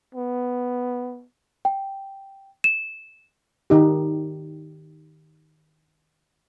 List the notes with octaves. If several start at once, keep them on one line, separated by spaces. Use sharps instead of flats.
B3
G5
E7
D#3 D#4 G4